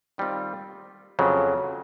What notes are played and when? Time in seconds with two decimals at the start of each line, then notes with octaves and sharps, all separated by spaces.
0.18 D#3 G3 C4 F4
1.19 F2 C#3 F#3